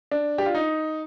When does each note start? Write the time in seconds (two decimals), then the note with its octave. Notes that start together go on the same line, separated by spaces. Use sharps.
0.11 D4
0.38 G4
0.46 F4
0.55 D#4